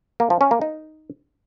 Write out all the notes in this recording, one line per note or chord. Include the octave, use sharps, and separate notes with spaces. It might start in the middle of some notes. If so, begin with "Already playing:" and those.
A#3
F3
C#4
A#3
D#4